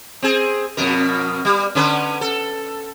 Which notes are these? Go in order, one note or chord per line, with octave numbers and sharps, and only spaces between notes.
C4 G#4
F2 B2 A#4
G3
D3 C#4 B4
A4